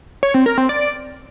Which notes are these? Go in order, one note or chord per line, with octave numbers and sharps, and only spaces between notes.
C#5
C4
A#4
C4
D5